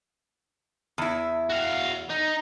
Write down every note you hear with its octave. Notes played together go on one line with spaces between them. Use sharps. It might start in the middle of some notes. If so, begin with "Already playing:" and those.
E2 E4
F#4 F5
D#4